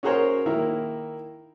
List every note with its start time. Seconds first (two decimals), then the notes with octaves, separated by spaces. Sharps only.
0.03 C#4 F#4 G#4 A#4 C5 C#5
0.46 D#3 A#3 E4